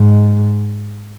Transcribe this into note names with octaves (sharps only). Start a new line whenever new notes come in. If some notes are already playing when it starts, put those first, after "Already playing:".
Already playing: G#2